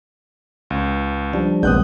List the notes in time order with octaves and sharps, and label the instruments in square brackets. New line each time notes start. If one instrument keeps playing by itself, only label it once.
[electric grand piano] C#2
[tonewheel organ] F3 G3 D4
[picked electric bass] D#1 A#1 C3 [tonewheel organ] G#3 B3 [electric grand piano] D#6 F#6 G6